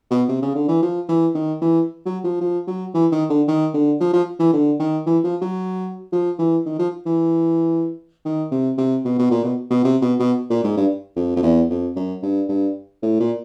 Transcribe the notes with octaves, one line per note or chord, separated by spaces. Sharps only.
B2
C3
C#3
D3
E3
F3
E3
D#3
E3
F#3
F3
F3
F#3
E3
D#3
D3
D#3
D3
F3
F3
E3
D3
D#3
E3
F3
F#3
F3
E3
D#3
F3
E3
D#3
C3
C3
B2
B2
A#2
B2
B2
C3
B2
B2
A#2
G#2
G2
F2
F2
E2
F2
F#2
G2
G2
A2
A#2